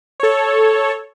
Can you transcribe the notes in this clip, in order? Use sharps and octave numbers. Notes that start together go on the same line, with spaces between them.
A4 C#5